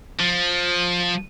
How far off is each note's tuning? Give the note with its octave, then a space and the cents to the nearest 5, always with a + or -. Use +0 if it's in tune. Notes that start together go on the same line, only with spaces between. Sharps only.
F3 +15